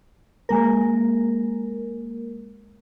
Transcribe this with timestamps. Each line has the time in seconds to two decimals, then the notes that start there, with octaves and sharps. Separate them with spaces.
0.49 G#3 A#3 A#4